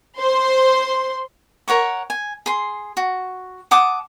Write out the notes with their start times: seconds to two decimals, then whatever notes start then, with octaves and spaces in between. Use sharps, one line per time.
0.18 C5 C6
1.68 A#4 C#5 F#5 C#6
2.10 G#5
2.46 G#4 C6
2.97 F#4
3.71 F#5 A5 D6 D#6